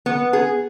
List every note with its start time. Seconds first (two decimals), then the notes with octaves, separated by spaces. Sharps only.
0.06 B3
0.33 G#4